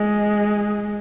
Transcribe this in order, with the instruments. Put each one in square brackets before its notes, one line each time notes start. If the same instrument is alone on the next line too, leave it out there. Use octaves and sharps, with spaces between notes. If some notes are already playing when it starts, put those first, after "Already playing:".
Already playing: [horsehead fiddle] G#3